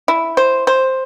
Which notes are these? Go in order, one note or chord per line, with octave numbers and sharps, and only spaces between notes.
E4
C5
C5